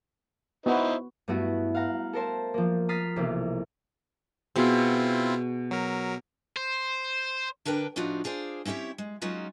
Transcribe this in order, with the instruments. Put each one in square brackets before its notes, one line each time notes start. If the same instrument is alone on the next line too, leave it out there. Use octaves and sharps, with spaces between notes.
[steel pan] B3 F#4 [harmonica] D#4 E4 C5
[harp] G2 A3 B3 E4 F#4
F5 F#5 A#5
A4 A#4 C5 A5
F3 A#3
A#5 D#6 F6 A6 B6 C7
B1 C3 E3 A#3
[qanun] B2 G#4 [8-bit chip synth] C4 E4 F4
[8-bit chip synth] F#3 A#4
[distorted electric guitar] C5
[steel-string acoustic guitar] D3 D4 A#4 B4 G5
A2 F3 D4 D#4 F4 F#4
D4 F4 G#4 C5 D5
C4 C#4 E4 G4 C#5
G#3
F#3 G#3 C#4 D#4 F4 F#4